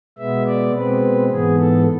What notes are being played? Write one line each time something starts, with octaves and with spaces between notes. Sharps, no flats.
B2 G#3 B3 E5
D5
B2 G#3 C4 B4
G#2 E3 B3 G#4
A4